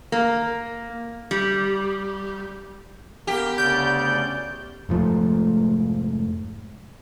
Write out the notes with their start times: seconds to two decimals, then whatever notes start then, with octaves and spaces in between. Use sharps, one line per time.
0.12 A#3
1.31 G3
3.27 A#3 B3 G4
3.58 D2 C#3 D5 G6
4.89 F1 G#2 F3 A3